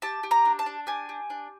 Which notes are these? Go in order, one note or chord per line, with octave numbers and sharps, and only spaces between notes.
G4 A5
G4
A#5
D4
A5
D4
G4 G#5
G4
D4